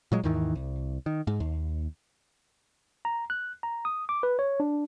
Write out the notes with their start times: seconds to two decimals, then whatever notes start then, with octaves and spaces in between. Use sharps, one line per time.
0.12 A#2 F#3 G#3
0.24 D#2 G#2 D#3 E3
0.55 C2
1.06 D#3
1.27 G#2
1.40 D#2
3.05 A#5
3.30 F#6
3.63 A#5
3.85 D#6
4.09 D6
4.23 B4
4.39 C#5
4.60 D4